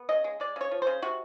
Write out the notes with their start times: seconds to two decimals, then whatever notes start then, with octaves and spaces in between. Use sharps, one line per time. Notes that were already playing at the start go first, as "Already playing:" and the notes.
Already playing: B3
0.09 C#3 D#5
0.24 G#3
0.40 G#3 D5
0.56 C#3 C#5
0.71 F3
0.82 C#3 C5
1.02 C3 F#4